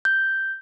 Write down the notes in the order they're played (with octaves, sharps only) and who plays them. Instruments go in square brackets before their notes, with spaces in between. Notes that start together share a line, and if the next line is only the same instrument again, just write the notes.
[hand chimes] G6